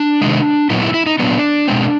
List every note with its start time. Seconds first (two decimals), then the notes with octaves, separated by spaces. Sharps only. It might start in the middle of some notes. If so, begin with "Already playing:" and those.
Already playing: D4
0.21 C3 D#3 G#3
0.70 A#2 F#3 B3 E4
0.82 E4
0.94 E4
1.06 D#4
1.19 A#2 F#3 B3 D4
1.68 B2 G#3 C4